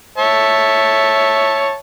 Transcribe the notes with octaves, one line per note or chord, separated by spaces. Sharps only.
C#5 E5 A5